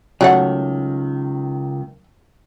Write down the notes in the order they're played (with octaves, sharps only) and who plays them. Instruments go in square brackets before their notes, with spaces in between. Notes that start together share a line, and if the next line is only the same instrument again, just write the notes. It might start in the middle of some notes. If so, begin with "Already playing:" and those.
[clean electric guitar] C#2 D#3 [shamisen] F#3 A3 F#5